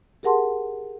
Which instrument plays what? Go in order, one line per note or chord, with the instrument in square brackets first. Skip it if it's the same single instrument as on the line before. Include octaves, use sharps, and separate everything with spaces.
[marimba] G4 G#4 A#4 F#5 A5 C6